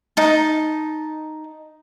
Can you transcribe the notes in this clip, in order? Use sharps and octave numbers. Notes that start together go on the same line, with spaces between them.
D#4 A5